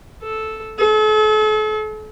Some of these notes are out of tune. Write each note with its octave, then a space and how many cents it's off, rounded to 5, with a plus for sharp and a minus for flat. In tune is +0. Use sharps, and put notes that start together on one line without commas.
A4 -5
A4 -40